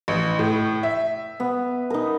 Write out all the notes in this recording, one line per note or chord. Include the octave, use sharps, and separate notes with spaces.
A1
A2
E5
B3
D#4 A#4